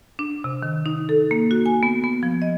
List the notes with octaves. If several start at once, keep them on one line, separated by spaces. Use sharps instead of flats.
D4
C3
D#3
D#4
A4
A#3
F#4
G#5
B3
B3
F3
D#5